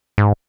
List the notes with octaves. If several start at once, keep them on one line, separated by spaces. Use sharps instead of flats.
G#2